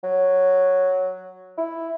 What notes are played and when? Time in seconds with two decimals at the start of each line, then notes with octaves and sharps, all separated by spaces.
0.04 F#3
1.58 E4